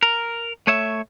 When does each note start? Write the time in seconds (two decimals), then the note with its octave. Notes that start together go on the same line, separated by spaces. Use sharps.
0.03 A#4
0.67 A3 C#5 E5